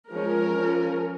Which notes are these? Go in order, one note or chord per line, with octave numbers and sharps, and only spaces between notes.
F3 G#3 C#4 A#4
F3 C#4